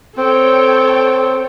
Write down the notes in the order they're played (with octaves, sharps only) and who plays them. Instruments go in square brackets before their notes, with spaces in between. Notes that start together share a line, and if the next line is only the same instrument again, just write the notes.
[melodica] C4 [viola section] A4 C#5 G5